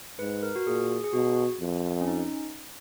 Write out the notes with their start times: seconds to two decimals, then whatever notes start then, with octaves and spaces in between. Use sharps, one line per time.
0.19 G#2 B4
0.43 A#4
0.56 F#4
0.67 A#2 G#4
1.04 G#4
1.13 B2 F#4
1.60 F2
2.01 C#4
2.08 D#4